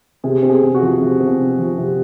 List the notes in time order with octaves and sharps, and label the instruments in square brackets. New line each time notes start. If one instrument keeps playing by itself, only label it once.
[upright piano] C3 G#4
C4
G#4
C3
F#4
F3
C3
C4
C3
F3
C3